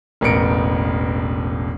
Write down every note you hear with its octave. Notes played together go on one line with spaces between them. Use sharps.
E1 A1 B3 A#4 C#7 D7